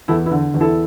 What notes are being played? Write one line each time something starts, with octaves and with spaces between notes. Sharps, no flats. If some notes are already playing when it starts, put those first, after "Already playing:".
E2 E4 A4
B3 E4
D3
E2
E4 A4